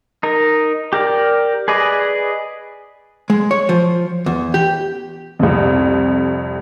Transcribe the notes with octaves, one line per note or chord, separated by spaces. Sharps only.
D#4 A#4
G4 A#4 D5
G#4 B4 D5 D#5
G#3
C#5
F3
E2
G4
C2 F2